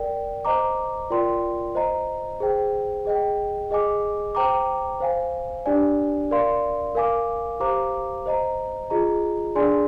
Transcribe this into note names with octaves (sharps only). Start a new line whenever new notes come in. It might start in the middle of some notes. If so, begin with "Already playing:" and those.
Already playing: A#4 D5 G5
C5 D#5 A#5 D6
F4 A#4 D5 G5 C6
C5 D#5 A#5
G#4 C5 G5
G#4 D#5 G5
G#4 D#5 G#5 D6
C5 G5 A#5 D6
C5 F5 G#5
D4 G4 D5 G#5
A#4 D5 F5 C6
A#4 F5 G#5 D6
G4 C5 F5 A#5 D6
C5 D#5 A#5
F4 G#4 D#5 A#5
D4 G#4 D5 G#5 C6